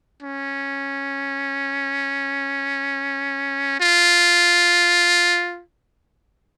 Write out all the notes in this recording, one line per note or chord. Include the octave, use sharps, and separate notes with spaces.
C#4
F4